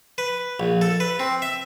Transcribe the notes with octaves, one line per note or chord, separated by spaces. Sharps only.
B4
A#1
A4
B4
C4
E5